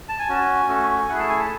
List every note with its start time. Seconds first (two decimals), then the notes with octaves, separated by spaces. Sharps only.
0.09 A5
0.19 G#5
0.29 C#4 F#4
0.68 A3 C#4 F#4
1.09 A3 E4 G#4 F#5
1.19 A5
1.29 G#5
1.39 A5